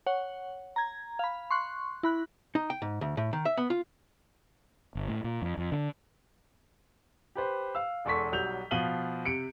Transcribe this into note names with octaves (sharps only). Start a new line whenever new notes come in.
C#5 F#5
A#5 G#6
F5 B5
C6 C#6 F#6
E4 B5 F#6
D#4
G5
G#2
D2
A2
D#3
E5
B3
F4
G1
A2
A#2
F2
F2
D3
G4 B4 C5
F5 E6
E1 E2 A4 C6 C#6 B6
B1 F#3 G3 G6 F7
B2 F3 F5 D#7 F#7 G7
C3 C#7 D7